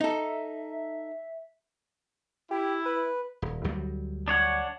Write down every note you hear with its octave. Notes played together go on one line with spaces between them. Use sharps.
D#4 A4 E5
E4 G4
B4
D#1
D2 F#3 G3
D4 C#5 F#5